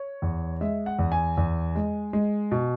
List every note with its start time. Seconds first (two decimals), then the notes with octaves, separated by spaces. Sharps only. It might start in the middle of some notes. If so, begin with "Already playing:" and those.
Already playing: C#5
0.22 E2
0.61 G#3 E5
0.86 F#5
0.99 E2
1.12 G#5
1.37 E2
1.76 G#3
2.13 G#3
2.52 B2